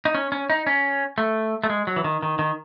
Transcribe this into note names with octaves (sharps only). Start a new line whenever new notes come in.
D#4
C#4
C#4
D#4
C#4
A3
A3
G#3
F#3
E3
D#3
D#3
D#3